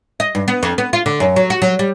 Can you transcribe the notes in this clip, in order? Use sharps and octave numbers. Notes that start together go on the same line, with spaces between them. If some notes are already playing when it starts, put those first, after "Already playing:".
D#5
G2
B3
F2
B3
F4
D3
F#2
F#3
F#4
F#3
G3